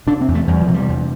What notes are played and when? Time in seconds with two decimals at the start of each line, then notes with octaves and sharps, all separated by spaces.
0.07 C3 D4
0.21 C4
0.28 E2
0.35 A3
0.47 E2 G3
0.61 F3
0.68 C3
0.74 G3
0.89 E2